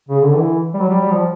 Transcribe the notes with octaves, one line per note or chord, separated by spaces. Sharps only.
C#3
D3
E3
G3
F#3
G3
G3
F3